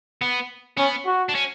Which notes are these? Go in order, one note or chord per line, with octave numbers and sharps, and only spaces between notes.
B3
B3 C#4
F#4
D4
C#4